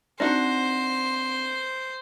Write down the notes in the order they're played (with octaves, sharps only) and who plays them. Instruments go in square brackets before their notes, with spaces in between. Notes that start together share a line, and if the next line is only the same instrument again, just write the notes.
[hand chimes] C4 E5 A#6 [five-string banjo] D4 D#4 F#4 [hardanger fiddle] C5